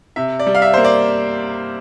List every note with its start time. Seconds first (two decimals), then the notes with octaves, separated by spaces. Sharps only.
0.16 C3 E5
0.40 D5
0.46 G3
0.55 F5
0.62 E5
0.74 A#3 C5
0.84 D5